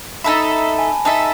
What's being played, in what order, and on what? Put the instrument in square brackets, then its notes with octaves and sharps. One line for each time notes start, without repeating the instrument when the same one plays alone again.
[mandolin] D#4 A4 E5 [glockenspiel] B5
[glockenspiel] A5
G#5
[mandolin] D#4 A4 E5 [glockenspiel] A5